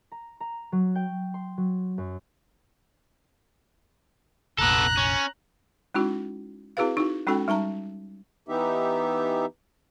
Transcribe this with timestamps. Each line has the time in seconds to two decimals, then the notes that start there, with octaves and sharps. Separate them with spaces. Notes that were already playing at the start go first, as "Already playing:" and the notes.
0.12 A#5
0.40 A#5
0.72 F#3
0.95 G5
1.34 C6
1.57 F#3
1.98 F#2
4.58 F1 A#1 B3 A4 A#5 F#6
4.97 C#4
5.95 G#3 C#4 D#4 E4 F#4
6.77 C4 E4 F#4 G#4 B4 F5
6.97 D#4 E4 F#4
7.27 G#3 C#4 D#4 F#4 A4 G5
7.48 G3 D#4 A5 A#5
8.49 E3 B3 D#4 G4 E5